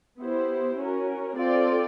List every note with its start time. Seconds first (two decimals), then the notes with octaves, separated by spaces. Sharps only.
0.19 B3 E4 G4 C5
0.78 C#4 F#4 A#4
1.37 C4 F4 A4 D5